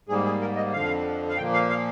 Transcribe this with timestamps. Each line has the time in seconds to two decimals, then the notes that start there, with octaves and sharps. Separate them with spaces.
0.08 G#2 G3 A#3 G#4
0.25 G#4
0.41 A#4
0.57 D#5
0.73 F2 D3 F3 F5
1.29 F5
1.37 A#2 F3 A#3 G5
1.53 F5
1.69 F5